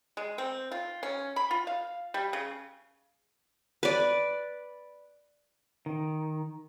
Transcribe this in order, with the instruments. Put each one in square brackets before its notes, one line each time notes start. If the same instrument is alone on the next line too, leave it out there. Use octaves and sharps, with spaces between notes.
[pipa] G#3
C4
F4
C#4
B5
F4
F5
G3
C#3
[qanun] B4 D5
[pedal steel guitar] D#3